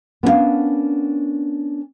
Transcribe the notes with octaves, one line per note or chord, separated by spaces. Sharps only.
B3 C#4 D4 E4 A#4 F5